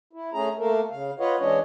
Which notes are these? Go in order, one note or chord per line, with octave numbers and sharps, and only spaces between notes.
E4
A3 C#4 G#4 A#5
A3 A#3 A4 A#4
C#3 F5
F4 B4 C#5 D#5 F5 F#5
E3 G#3 C#4 D4 C#5 D#5